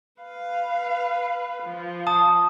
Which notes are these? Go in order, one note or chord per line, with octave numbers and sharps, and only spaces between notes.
B4 F5
F3
A5 D#6